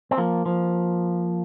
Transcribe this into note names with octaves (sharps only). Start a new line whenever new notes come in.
C4
F3 A#3
F3 A#3